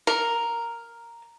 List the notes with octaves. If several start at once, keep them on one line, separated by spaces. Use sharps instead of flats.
A#4